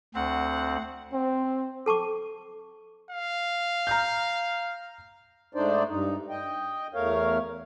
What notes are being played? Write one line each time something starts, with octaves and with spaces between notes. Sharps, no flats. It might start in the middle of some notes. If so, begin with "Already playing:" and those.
D2 C4 F#5
C4
A4 A5 C#6 D6
F5
A#5 F6 G6
G#2 A3 D4 D#4 C5 D5
G2 D#4
D#5 G5
E2 A3 A#4 C#5 F5